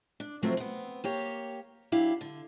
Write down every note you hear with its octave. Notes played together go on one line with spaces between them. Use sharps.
D4
C3 F3 F#3 A3 C4
B3 C4
A#3 G4 C#5
F#3 D4 E4 G4 F5
D3